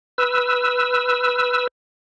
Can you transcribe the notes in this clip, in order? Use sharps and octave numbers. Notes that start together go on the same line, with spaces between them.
B4 E6